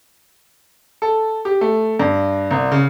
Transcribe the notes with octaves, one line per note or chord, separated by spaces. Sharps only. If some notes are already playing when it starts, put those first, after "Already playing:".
A4
G4
A3
G2
C2
C#3